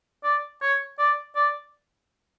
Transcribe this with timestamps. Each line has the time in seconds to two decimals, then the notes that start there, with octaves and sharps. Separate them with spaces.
0.24 D5
0.62 C#5
0.98 D5
1.35 D5